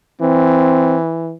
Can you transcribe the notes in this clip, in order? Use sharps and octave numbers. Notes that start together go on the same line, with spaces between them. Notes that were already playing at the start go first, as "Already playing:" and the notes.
E3 C4